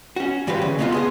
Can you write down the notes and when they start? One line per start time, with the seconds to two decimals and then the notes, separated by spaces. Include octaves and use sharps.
0.16 C#4 F#4
0.47 G2 E3 F#4 G4 B4 C5
0.62 D2 C#3
0.79 A3 B3 C#4 D#4 F4 F#4
0.92 B3 G#4 C6